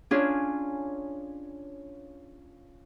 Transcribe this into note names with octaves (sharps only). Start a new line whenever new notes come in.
C#4 D4 F4 G#4